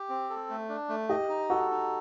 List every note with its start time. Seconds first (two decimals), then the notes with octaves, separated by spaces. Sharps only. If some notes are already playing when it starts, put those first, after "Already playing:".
Already playing: G4
0.09 C4
0.30 A4
0.50 A3
0.69 D4
0.89 A3
1.09 G4 D#5
1.29 D#4
1.50 F#4 A4
1.71 D#4